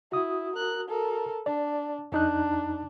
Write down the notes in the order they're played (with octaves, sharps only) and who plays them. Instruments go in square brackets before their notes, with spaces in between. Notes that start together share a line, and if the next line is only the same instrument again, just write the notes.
[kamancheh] E4 [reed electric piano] F#4 D#6
[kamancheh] A#4 F#6
A4 A#4
[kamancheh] D4 [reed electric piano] D5
[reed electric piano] F2 D#4 F#6 [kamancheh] D4